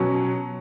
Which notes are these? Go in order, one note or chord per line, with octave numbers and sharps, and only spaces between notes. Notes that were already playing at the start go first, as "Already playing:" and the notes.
Already playing: B2 F#3 C#4